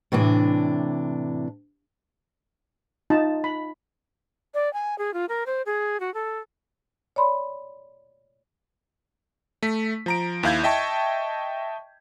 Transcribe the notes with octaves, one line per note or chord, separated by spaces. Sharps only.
A2 C3 E3 D4
D#4 F4 A5
B5
D5
G#5
G#4
F4
A#4
C5
G#4
F#4
A4
C#5 D5 B5 C6
A3 B6
F3 A#5 D7
D#2 E4 F5 G6 G#6
D#5 E5 G5 A5 C#6